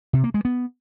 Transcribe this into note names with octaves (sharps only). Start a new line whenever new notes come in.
C3
A#3
G#3
B3